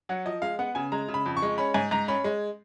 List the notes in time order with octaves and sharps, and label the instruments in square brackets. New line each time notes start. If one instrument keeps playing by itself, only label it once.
[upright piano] F#3 F#5
F3 D#5
G#3 F5
B3 F#5
C#3 G#5
G#3 A#5
C#3
B5
F2
C#6
G#3
C#4 B5
G#2 G#5
G#2 A#5
C#4 B5
G#3